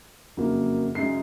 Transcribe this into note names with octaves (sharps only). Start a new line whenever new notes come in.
F#1 F2 C#3 F#3 A#3
F#2 C#3 G#3 C7